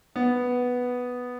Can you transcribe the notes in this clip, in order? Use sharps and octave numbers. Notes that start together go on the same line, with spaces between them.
B3